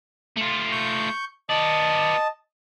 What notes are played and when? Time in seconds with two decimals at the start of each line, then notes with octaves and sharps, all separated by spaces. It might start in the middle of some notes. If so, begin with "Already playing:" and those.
0.36 A3 F4
0.72 C#6 G6
1.49 B3 D5 D#5 A5